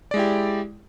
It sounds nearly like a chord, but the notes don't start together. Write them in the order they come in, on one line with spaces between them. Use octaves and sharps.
D5 G#3 E4 G4